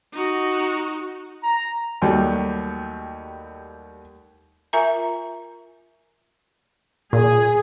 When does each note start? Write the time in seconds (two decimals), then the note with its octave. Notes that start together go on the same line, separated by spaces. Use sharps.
0.14 D#4 F#4
1.43 A#5
2.02 D#2 F#3 G3 A3
4.73 F4 A#4 E5 G#5 A#5
7.13 A#2 G#4